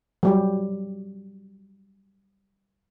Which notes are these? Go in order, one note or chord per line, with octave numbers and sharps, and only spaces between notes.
F#3 G3 G4